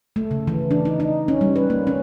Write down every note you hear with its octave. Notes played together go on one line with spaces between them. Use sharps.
A3
C#3
E3
D4
D#4
D#4
C#4
G3
B4
A#3
C#4